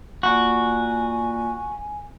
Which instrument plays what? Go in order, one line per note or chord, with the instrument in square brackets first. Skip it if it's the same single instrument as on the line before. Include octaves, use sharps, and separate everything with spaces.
[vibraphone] A#3 F4 D5 [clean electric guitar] F#4 [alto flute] G#5